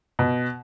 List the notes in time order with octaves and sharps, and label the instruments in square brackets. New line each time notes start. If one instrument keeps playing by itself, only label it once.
[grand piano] B2